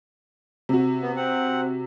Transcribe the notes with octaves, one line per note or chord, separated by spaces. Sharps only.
C3 F#4
B3
C4 F#5